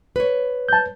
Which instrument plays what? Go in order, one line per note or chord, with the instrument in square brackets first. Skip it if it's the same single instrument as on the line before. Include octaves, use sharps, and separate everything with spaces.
[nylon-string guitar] B4 C#5
[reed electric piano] A5 G6